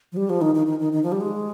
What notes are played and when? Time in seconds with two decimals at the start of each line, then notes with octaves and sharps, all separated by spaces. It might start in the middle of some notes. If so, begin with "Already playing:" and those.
0.12 F3
0.17 G3
0.30 F3
0.41 D#3
0.55 D#3
0.67 D#3
0.79 D#3
0.93 D#3
1.03 F3
1.12 G3
1.21 G#3